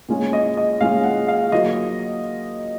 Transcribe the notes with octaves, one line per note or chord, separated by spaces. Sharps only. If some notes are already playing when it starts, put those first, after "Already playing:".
A#2 G#3 C#4 F4
D#5
D#5
A#2 G#3 C#4 F4 F5
F#5
F5
F#3 A#3 F4 D#5